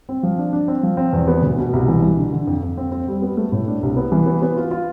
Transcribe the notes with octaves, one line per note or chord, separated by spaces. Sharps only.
C4
F3
D4
D4
C4
F3
C4
E2
B3
D2
B2
C2
E3
E3
D3
D3
F2
F2
C4
C4
G3
B3
A3
A2
D4
C2
B3
E3
B3
B3
F4
F4